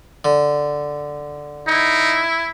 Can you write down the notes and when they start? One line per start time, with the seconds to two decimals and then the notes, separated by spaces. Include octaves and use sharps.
0.25 D3
1.67 D#4 E4